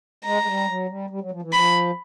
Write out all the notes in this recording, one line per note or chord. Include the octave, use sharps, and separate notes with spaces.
G#3 A#5
G#3
G3
F#3
G3
G3
F#3
F3
E3
F3 B5